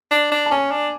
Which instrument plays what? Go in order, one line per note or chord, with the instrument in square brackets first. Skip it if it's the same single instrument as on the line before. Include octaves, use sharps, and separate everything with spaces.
[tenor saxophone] D4
D4
[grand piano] A5
[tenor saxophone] C#4 [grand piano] G#5
[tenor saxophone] D4